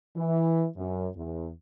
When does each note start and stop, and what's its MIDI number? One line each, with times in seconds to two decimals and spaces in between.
0.16 0.66 52
0.77 1.07 42
1.16 1.49 40